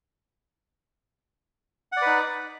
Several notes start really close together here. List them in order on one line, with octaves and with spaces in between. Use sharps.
F#5 D5 B4 D#4